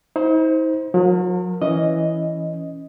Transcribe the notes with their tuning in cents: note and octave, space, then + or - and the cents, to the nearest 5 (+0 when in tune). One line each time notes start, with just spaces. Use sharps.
D#4 +45 C5 +0
F#3 -40 A#4 +0
E3 +0 C#4 +0 D#5 +0